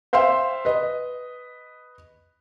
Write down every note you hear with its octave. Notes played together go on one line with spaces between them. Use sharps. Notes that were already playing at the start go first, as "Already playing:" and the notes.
C5 E5 F5 G5 C6
B4 D#5